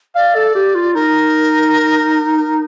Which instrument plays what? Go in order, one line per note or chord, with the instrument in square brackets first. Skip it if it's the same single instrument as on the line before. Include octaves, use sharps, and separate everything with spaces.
[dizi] D5 [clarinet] F5
[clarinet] A4
G4
F4
[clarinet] D#4 [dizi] A#4